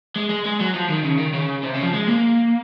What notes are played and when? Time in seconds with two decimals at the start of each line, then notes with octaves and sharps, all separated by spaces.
0.16 G#3
0.30 G#3
0.45 G#3
0.60 F#3
0.74 F3
0.89 D#3
1.04 C#3
1.19 D#3
1.34 C#3
1.64 C3
1.74 C#3
1.83 F3
1.94 G#3
2.08 A#3